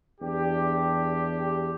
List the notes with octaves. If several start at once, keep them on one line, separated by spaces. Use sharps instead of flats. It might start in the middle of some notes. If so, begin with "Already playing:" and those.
E2 D4 G4